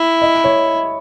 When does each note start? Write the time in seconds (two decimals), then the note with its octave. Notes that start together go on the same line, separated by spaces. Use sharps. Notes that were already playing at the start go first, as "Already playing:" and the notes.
Already playing: E4
0.22 D#5
0.44 C#5